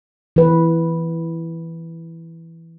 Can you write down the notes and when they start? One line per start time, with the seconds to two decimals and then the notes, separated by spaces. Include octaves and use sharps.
0.36 E3 B4